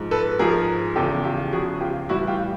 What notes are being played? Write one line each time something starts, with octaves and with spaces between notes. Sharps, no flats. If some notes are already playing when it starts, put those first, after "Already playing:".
Already playing: G#2 F3
A4 B4
G#2 F3 G#4 A#4
E2 C#3 F3 G4 A4
F4 G4
E2 C#3 F3 F#4 G#4
F4 G4
A2 E3 G3 E4 F#4
F4 G4